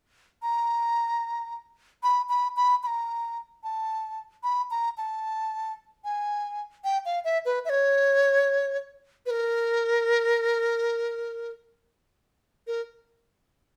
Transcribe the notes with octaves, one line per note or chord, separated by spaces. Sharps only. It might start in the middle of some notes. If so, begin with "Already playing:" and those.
A#5
B5
B5
B5
B5
A#5
A5
B5
A#5
A5
G#5
G5
F5
E5
B4
E5
C#5
B4
A#4
A#4